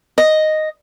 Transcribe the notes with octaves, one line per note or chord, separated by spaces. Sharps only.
D#5